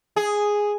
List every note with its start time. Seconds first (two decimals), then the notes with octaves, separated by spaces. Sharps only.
0.16 G#4